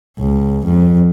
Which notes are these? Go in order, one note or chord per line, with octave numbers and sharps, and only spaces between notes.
C#2
F2